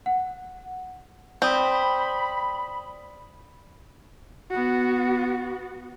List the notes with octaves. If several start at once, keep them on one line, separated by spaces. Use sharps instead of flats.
F#5
C4 D5 B5 D#6
B3 F#4